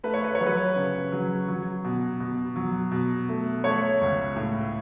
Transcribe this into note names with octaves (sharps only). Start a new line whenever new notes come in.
A3 B4
C#5
B4
C#5
F#3
B4
C#3
F#3
F#3
B2
B2
F#3
B2
A3
A3 C#5
C#2
A2